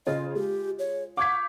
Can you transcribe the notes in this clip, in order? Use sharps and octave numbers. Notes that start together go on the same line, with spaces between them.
C#3 F4 G#4 C5 D#5
G#3 G4
C#5
F5 F#5 C#6 D6 G6 G#6 B6